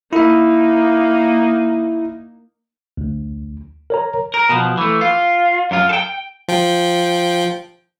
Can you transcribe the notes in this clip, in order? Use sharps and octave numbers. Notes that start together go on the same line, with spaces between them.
A#3 D#4 E4 E5
D2
A#4 C#5 A#5
A#4
B2 F3
E3 A3
F4
F#2 F4
A4 G5
F3 G5